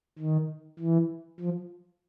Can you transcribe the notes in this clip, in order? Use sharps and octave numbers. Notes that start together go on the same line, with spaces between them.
D#3
E3
F3